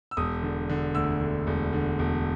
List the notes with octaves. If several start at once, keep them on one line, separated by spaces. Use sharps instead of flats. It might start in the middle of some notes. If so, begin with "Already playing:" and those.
E6
E1 D#6
D3
D3
D2 E6
D3
E1
D3
E1